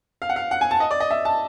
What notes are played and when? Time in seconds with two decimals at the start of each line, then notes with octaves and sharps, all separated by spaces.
0.22 F5
0.29 F#5
0.36 F5
0.51 F#5
0.61 G#5
0.71 A5
0.80 D#5
0.91 D5
1.00 D#5
1.11 E5
1.25 A5